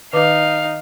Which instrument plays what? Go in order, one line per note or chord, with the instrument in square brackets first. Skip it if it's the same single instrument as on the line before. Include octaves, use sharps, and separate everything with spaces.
[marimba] D#3 B4 D6 [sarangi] D#4 [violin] F5